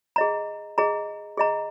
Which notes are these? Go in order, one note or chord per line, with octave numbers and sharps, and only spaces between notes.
G#4 D#5 A#5
G#4 D#5 A#5
G#4 D#5 A#5